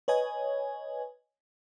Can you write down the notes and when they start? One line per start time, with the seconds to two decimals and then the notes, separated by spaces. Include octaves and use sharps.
0.08 B4 C#5 D#5 G#5